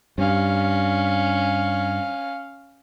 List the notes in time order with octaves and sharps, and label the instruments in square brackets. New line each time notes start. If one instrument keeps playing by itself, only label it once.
[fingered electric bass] G2 [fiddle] C#4 F5